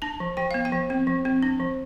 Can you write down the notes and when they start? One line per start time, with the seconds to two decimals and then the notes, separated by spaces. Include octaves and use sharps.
0.02 D4 A5
0.20 F3
0.37 F3 G5
0.51 B3 F5
0.65 G5
0.72 F3
0.90 C4
1.07 F3
1.25 C4
1.43 D4
1.60 F3